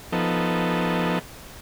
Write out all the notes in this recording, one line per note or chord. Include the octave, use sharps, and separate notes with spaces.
F3 B3 D#4 A4